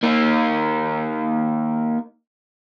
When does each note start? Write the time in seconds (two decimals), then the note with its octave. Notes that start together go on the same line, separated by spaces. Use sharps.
0.03 A#3 D#4